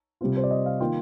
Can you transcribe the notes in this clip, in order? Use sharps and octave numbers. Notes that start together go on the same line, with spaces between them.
C3 G3 C4 F4
C5
D5
D#5
F5
D#3 A#3 F4 G5